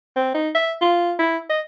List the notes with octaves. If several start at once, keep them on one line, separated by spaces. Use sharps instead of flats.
C4
D#4
E5
F4
E4
D#5